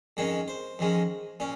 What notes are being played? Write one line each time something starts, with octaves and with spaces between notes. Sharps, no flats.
F2 D#3 G#3 C#4 C#5
C5
F2 D#3 G#3 C#4
A#2 C#4